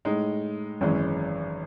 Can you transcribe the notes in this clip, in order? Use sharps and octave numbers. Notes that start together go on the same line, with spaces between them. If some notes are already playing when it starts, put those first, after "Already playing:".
A2 G#3 D#4
G#1 F#2 E3 G#3 C#4